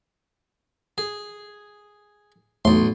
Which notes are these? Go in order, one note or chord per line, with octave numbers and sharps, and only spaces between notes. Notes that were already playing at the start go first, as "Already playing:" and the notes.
G#4
B1 E2 A2 C6